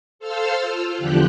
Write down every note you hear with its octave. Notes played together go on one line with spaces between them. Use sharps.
A4 C5 F5 E6 F6
F4
E2 D3 F3 G4 G5 F#6